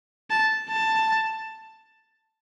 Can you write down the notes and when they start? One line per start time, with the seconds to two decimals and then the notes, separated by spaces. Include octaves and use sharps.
0.30 A5
0.69 A5